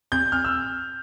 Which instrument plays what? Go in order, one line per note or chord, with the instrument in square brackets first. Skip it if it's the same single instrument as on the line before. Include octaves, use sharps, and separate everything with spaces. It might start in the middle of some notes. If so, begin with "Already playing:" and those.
[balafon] C4 [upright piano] G6
[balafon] C4 [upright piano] F6
[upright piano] E6